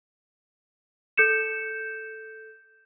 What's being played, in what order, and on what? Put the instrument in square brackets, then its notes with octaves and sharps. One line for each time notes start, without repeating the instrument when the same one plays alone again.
[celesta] A4 G6 C#7 E7